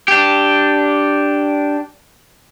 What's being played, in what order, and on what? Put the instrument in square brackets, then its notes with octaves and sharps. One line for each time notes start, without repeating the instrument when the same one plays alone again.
[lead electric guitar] D4 G4